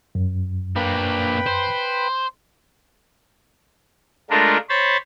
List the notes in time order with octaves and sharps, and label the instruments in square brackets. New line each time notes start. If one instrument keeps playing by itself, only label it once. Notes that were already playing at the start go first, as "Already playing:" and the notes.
[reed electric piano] F#2
[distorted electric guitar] A#3 D4 [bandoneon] B4 G5 B5
[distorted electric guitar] C5
[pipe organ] G#3 A3 D4 F4 A#4
C5 C#5 B5 A6